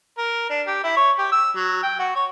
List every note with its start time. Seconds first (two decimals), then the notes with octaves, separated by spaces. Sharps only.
0.18 A#4
0.50 D4
0.67 G4
0.84 E4
0.97 C#5
1.19 G4
1.32 E6
1.57 F#3
1.83 G5
1.99 F#4
2.16 C#5